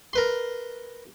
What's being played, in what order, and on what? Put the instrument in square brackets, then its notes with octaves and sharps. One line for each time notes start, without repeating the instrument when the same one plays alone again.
[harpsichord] A#4 B4 C6